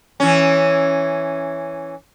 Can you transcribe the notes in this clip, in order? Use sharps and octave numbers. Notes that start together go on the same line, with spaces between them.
E3 C#4